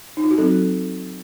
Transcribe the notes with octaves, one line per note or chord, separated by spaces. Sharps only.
D#4
F4
F#4
F#3 C4 A4